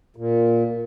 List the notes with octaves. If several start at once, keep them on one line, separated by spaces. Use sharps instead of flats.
A#2